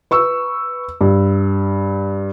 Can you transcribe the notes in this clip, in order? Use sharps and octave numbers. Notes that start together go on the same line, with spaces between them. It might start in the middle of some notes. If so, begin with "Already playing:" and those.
B4 C#6 E6
G2